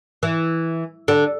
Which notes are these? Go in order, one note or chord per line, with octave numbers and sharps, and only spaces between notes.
E3
D3